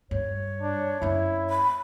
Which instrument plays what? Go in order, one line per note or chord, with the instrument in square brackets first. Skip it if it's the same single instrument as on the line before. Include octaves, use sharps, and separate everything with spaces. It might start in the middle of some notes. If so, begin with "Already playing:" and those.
[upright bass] G2 [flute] C#5
[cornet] D4
[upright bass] F#2 A#3 [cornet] E4
[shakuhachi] B5